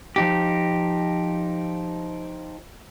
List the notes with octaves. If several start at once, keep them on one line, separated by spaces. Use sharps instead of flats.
F3 D#4 G4